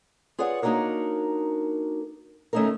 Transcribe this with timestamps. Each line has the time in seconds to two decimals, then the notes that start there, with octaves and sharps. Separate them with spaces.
0.38 F4 G#4 B4 C#5 D5 F#5
0.62 A#3 D4 D#4 F#4 A#4 C#5
2.53 D#3 A3 C#4 D#4 E4 A#4